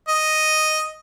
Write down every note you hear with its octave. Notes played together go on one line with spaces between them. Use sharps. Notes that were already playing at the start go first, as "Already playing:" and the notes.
D#5